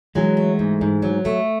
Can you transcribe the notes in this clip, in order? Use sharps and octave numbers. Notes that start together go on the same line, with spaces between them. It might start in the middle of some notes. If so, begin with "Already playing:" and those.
E3 F#3 G#3
A3
G#2
G#2
F#3
A3